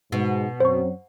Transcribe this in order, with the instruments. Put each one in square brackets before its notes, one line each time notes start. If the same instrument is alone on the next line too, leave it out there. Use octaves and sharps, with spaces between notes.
[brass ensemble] G#2 [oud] B2
[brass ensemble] F#2 F#3 C4 [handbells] C5 C#6